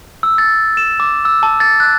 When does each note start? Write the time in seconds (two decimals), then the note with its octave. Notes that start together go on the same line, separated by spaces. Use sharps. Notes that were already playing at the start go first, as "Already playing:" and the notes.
0.23 E6
0.38 A6
0.77 E7
1.00 D6
1.25 E6
1.43 A5
1.60 A6
1.80 F#6